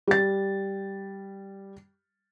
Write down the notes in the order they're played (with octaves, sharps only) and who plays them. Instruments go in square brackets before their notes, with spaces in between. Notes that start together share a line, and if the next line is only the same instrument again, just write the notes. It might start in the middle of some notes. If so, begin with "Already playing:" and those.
[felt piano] G3 A6